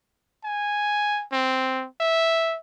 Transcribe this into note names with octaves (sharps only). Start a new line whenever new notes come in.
G#5
C4
E5